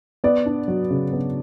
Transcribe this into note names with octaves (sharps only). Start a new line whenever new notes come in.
B3 D5
D4
F#3
C#3
B3